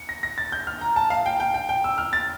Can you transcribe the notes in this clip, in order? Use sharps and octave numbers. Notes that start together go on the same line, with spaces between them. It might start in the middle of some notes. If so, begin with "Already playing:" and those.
Already playing: C#7
A#6
A#6
A6
G6
F6
A#5
A5
F5
G5
G5
G5
G5
E6
F6
A6